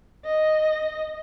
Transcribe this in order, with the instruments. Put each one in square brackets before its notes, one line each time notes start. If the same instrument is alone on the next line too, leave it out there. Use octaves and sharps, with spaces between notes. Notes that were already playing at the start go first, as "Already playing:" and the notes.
[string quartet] D#5